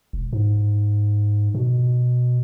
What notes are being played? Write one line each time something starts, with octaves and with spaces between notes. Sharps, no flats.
E1
G#2
B2